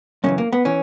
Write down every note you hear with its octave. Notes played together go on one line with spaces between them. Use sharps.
F#2 C#3 E3 C#4
A#3
B3
E3 C#4